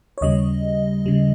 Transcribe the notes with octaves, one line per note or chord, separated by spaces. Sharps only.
C#5
D#2 C#3 G3 D#5
C#3 G3